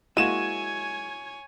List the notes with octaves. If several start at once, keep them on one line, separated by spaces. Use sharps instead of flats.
G#3 A#3 E4 F#4 C#5 G#5 D#7 E7